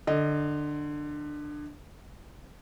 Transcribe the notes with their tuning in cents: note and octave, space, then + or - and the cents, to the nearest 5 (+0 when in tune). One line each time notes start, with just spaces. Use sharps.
D3 +15 D#5 +0